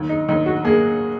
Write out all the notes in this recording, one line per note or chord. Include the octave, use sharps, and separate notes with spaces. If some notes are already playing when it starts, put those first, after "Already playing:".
Already playing: D#2
D#4
D#2 D#4
F#4
A#3 G#4